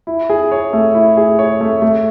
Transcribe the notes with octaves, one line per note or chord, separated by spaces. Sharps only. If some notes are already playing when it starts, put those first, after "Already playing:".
E4
G#4
C#5
A3
E4
G#4
C#5
A3
A3